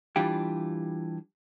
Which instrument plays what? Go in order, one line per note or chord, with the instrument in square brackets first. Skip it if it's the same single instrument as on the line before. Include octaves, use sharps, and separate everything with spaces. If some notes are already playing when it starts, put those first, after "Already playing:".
[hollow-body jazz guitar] E3 G3 D4 F4 G4